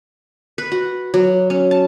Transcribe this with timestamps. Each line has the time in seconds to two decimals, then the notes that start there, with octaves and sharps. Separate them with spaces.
0.58 B4
0.72 F#4
1.14 F#3
1.50 C#4
1.71 A5